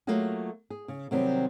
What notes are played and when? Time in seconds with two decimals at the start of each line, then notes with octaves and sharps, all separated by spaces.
0.07 F#3 A3 A#3 F4 F#4 G#4
0.70 G#4
0.88 C#3
1.11 C3 D#3 F#3 G3 C4